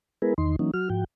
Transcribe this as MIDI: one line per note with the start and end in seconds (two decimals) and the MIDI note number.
0.22 0.34 56
0.22 0.34 59
0.22 0.34 64
0.22 0.34 68
0.22 0.34 70
0.22 0.34 71
0.38 0.56 40
0.38 0.56 51
0.38 0.56 63
0.38 0.56 84
0.59 0.71 52
0.59 0.71 54
0.59 0.71 58
0.59 0.71 61
0.59 0.71 63
0.74 0.89 54
0.74 0.89 66
0.74 0.89 89
0.90 1.04 44
0.90 1.04 53
0.90 1.04 66
0.90 1.04 79